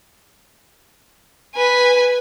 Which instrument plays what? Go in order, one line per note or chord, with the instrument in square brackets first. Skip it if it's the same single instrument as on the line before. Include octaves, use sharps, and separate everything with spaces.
[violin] B4 G#5